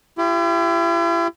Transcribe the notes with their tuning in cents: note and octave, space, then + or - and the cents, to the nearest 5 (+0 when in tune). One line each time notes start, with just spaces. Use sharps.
E4 +45 G4 +0